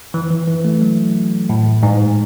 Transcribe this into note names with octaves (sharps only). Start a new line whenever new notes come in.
E3
E3
E3
A3
F#3
A2
G#2